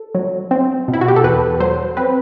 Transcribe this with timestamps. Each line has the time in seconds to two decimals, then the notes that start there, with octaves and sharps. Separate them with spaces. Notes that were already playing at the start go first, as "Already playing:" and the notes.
Already playing: A4
0.15 F#3
0.51 C4
0.88 B2
0.94 E4
1.01 F#4
1.08 G4
1.16 A4
1.24 E2 B4
1.60 F#3 C5
1.97 C4 B4